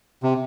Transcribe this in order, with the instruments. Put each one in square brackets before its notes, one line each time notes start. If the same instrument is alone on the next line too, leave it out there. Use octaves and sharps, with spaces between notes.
[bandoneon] C3